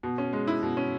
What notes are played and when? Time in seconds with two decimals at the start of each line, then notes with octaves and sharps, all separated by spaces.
0.03 B2
0.18 C#4
0.33 G#3
0.47 E4
0.63 B2
0.77 C#4